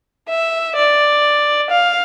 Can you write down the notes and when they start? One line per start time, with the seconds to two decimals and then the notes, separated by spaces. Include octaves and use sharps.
0.29 E5
0.76 D5
1.70 F5